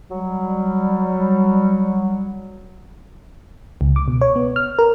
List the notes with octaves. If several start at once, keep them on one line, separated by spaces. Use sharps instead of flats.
F#3 G3
C#2
D6
B2
C#5
B3
F6
A#4